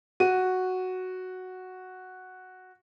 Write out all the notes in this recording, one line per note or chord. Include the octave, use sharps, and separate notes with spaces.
F#4 D#7